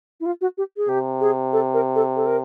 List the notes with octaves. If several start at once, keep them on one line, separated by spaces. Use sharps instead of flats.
E4
F4
F#4
G4
G#4
C3 G4
G#4
A4
A#4
A4
A4
A#4